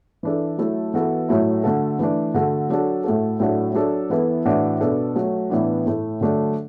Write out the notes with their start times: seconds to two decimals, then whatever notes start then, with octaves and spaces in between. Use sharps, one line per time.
0.23 E3 D4 A4
0.58 F#3 A3 E4 A4
0.94 E3 B3 F#4 A4
1.29 A2 F#3 A3 E4
1.64 D3 A3 F#4 A4
1.99 E3 A3 D4
2.34 D3 A3 F#4 A4
2.69 F#3 D4 F#4 A4
3.04 A2 A3 F#4 A4
3.40 A2 F#3 D4 F#4 A4
3.75 F#3 D4 A4
4.10 E3 B3 E4 A4
4.45 A2 E3 D4 F#4
4.81 B2 B3 D4 A4
5.15 F#3 A3 F#4
5.50 A2 E3 B3 D4
5.86 A2 A3 E4
6.21 D3 F#3 A3 D4